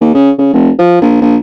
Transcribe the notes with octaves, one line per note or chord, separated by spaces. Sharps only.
D#2
C#3
C#3
F1
F3
A#1
A#1